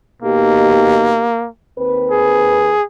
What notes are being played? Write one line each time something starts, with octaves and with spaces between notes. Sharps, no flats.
B2 A#3 D#4 G4
D#2 C4 B4
G#4